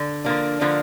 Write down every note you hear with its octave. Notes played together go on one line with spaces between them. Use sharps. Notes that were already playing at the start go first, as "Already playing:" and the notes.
Already playing: D3
D3 F3 A#3 D4
D3 F3 A#3 D4